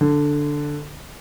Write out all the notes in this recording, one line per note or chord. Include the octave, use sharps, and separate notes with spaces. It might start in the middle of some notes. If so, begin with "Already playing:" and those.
D3